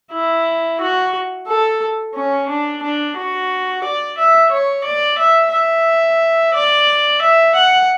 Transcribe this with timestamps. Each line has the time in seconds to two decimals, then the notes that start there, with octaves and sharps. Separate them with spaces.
0.13 E4
0.81 F#4
1.48 A4
2.15 C#4
2.49 D4
2.83 D4
3.17 F#4
3.84 D5
4.18 E5
4.52 C#5
4.85 D5
5.18 E5
5.53 E5
6.54 D5
7.22 E5
7.55 F#5